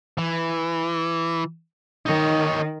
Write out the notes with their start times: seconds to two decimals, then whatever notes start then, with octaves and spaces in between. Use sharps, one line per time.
0.18 E3
2.06 D#3 D#4 C#5